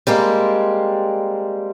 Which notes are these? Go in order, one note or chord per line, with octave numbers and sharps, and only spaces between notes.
G3 G#3 A#3 C4